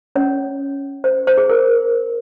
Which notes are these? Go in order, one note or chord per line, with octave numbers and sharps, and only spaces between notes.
C#4 C#5
C5
C5
G#4
A#4